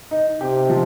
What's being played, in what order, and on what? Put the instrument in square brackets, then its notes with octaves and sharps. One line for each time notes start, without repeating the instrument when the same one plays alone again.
[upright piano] D#4
[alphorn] C3 [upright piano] G4
[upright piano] F3